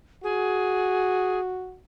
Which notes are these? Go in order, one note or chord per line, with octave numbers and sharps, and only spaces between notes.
F#4 G#4